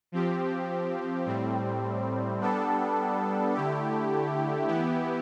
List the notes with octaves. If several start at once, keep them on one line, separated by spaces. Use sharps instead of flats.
F3 C4 G4
A2 G3 C4
G3 B3 D4 A4
D3 A3 E4 G4
E3 B3 E4 G4